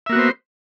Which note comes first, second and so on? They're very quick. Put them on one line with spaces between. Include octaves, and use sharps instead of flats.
E5 A#3 F#4 B3 C5